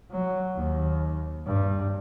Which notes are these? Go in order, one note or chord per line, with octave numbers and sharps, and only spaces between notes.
F#3
D#2
G2